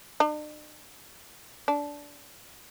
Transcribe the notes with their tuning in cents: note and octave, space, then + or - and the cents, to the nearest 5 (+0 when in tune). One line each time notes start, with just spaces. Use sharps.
D4 +45
D4 -15